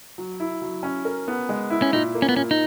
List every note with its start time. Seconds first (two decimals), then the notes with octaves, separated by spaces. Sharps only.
0.18 F#3
0.40 E4
0.62 F#3
0.83 C#4
1.05 A#4
1.28 B3
1.49 G#3
1.70 E4
1.82 C#4
1.93 A#2 D#4
2.15 A#3
2.22 C#4
2.29 B3
2.36 A#2 C#4
2.51 D#4